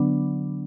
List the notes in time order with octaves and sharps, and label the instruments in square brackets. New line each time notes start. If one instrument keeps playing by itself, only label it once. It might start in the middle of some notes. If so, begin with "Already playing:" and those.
Already playing: [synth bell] D3 F#3 B3 D4